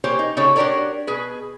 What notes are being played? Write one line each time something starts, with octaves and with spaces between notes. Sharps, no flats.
E3 A#3 G4 C5 C#5
D#4
C#3 A#3 D#4 G4 A4 C#5
D4 F#4 G4 A#4 C#5 D5
B2 G#4 B4